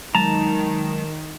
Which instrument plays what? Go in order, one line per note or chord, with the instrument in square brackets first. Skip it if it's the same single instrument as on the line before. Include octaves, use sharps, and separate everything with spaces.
[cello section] D#3 [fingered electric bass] F#3 G#3 [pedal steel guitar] A5 A#5